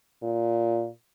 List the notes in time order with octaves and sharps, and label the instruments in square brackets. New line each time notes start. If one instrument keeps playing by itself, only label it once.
[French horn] A#2